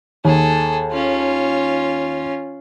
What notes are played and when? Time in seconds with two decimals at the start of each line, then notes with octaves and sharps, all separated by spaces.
0.25 D#2 G#4 A4
0.91 C#4 F4